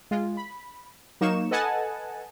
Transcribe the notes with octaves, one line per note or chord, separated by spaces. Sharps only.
G#3 F4
B5
F#3 A#3 D#4 C#6 E7
A4 B4 D#5 F#5 G#5 A5